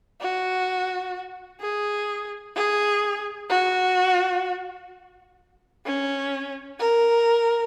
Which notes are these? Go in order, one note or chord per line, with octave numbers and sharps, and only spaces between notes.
F#4
G#4
G#4
F#4
C#4
A#4